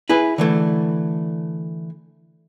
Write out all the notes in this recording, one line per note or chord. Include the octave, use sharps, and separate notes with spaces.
E4 G#4 B4
D3 E3 A3